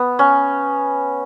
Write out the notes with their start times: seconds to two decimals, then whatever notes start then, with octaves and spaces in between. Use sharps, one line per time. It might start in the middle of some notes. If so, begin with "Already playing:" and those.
Already playing: B3
0.19 C#4